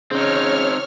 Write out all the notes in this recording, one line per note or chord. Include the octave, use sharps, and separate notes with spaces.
C#3 C4 D#4 C#5 F6